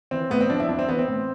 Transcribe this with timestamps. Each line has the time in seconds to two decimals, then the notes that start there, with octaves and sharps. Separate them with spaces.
0.11 E3 C4
0.30 A2 B3
0.41 C4
0.50 F3 D4
0.60 E4
0.69 F2 D4
0.79 C4
0.88 E3 B3
0.99 C4
1.08 A2